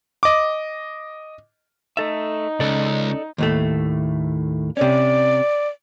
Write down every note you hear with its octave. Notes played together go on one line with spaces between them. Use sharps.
D#5 D6
A3 D#4 A4 E5
C#2 A4 D5
D#2 A2 A3
C3 C#4 D5